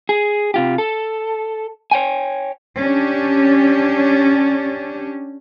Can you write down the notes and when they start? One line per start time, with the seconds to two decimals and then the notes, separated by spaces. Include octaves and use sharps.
0.09 G#4
0.54 C3 F4 G4
0.78 A4
1.91 C#5 G5 G#5
2.78 C#4 D4 G4